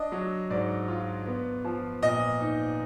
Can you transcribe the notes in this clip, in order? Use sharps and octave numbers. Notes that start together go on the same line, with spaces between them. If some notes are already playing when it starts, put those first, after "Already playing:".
Already playing: D4 D#5
F#3
G#2 D5
F4
B3
F3
A#2 D#5
D#4